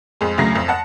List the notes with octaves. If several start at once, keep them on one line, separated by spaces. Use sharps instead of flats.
F2 G#3
D2 C#3 F#3 A#6 C7
F2
F#5 A5